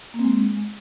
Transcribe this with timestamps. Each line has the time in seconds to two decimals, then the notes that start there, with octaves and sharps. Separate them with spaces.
0.14 A#3
0.19 C4
0.25 G#3